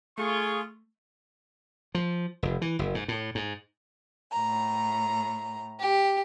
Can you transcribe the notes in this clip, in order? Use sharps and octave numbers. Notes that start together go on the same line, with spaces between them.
A3 F4 G#4 C#6
F3
F1
E3
F#1
G#2
A2
G#2
A2 A#5
G4